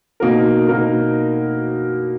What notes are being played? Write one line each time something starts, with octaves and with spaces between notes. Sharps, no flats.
B2 A#3 D#4 F#4 A#4
B2 A#3 D#4 F#4 A#4